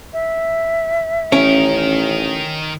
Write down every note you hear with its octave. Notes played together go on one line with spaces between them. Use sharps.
E5
A1 D#3 C#4 A#4